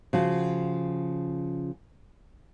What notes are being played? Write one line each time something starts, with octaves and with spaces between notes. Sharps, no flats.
C#3 F3 F#4